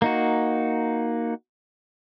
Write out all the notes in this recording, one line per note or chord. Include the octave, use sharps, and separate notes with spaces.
A#3 D#4 F#4